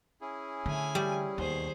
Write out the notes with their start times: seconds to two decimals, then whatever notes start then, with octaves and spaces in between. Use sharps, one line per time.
0.21 C#4 E4 G#4
0.66 D3 A3 G#5
0.95 G3
1.38 D#2 B2 D#3 G#4 C5